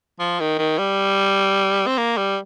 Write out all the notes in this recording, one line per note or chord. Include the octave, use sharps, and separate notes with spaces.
F3
D#3
D#3
G3
C4
A#3
G3